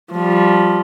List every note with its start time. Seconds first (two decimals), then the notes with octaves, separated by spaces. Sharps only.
0.12 F3 G3